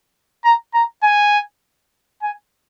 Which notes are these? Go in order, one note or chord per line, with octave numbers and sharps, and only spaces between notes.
A#5
A#5
G#5
G#5